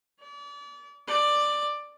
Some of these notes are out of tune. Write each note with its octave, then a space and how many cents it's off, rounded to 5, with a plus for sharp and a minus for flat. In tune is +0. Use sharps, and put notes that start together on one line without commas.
D5 -35
D5 +10